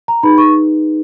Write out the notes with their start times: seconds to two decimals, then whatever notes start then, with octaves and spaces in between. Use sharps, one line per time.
0.08 A#5
0.23 D#4 G#4 B4 B5
0.38 C#6